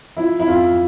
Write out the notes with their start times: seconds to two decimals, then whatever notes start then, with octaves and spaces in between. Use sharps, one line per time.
0.17 F3 E4
0.40 E4
0.48 F2 F4